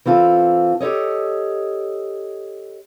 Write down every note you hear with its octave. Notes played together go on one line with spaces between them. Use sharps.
E3 C4 F4 A4
G4 A4 C#5 D#5